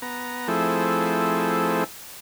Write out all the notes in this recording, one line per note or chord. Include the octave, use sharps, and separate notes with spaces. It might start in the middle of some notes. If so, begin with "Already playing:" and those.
B3 A#5
F3 A3 C4 E4 G#4 A4